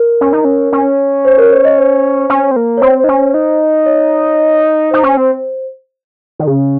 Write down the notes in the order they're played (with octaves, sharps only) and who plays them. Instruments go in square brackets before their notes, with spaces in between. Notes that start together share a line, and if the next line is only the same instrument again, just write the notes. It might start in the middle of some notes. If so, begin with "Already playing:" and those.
Already playing: [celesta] A#4
[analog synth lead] C#4
D#4
C#4
C#4
[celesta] C5
A#4
C5
D#5
C5
[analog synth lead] C#4
C4
A#3
[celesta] C#5
[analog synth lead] C4 [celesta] C5
[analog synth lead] D#4
C#4
D#4
[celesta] C#5
[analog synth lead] D#4 [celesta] C5
[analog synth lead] C#4
C4
D#3
C#3